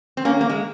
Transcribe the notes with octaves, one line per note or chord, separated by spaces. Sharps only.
C4
A#3 C#4
A#3
G#3